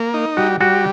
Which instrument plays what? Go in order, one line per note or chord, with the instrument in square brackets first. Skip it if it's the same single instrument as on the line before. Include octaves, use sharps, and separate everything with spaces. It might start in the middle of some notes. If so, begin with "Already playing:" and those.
Already playing: [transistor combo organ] A#3
D#4
[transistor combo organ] G3 [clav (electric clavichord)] F#4
[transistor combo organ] G3 [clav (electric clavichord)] F#4